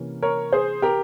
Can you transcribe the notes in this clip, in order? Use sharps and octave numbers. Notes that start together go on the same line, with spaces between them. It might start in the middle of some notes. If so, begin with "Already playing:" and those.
Already playing: C3 E3 A#3 C#4
A#4 C#5
G#4 C5
G4 A#4